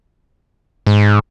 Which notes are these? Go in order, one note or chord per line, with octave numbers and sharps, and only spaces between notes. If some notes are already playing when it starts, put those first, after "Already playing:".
G#2